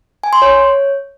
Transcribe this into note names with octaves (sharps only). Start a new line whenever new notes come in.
G#5
C6
C#5